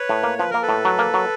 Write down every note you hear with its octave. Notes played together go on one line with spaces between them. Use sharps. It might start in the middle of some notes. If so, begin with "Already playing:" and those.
Already playing: B4 C#5
A2
A#3
F3 B4
A#3 A#4
A4 B4
A2
F#3
A#3
F#3